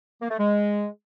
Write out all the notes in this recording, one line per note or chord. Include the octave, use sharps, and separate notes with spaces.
A#3
A3
G#3